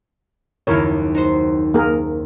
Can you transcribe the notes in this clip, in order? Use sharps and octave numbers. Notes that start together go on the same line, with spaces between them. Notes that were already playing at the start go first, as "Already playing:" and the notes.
F#1 D#2 E4 A#4 C#5
D#4 F#4 C5
A#3 G#4 A#4